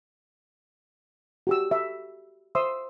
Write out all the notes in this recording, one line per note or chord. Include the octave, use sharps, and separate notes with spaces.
F#4 G4 E6
E5
C5 E5 C6 D#6 E6